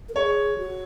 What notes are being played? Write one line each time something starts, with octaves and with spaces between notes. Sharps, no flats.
A#4
G#4 C#5
F#4